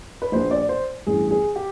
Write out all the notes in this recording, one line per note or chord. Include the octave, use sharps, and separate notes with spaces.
B4
A#1 A#2 C5
D5
C5
A1 G2 E3 G#4
G#4
G4